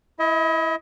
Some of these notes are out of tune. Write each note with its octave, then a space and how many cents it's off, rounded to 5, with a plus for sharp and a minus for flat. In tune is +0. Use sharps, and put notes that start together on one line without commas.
E4 +0 D#5 +40